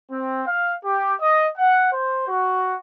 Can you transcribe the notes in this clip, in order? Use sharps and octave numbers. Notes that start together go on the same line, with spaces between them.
C4
F5
G4
D#5
F#5
C5
F#4